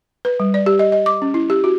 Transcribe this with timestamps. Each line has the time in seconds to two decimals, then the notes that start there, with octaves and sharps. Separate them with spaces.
0.25 B4
0.40 G3
0.54 D5
0.66 G4
0.79 D#5
0.92 D#5
1.06 D6
1.22 C#4
1.34 E4
1.50 G4
1.64 F#4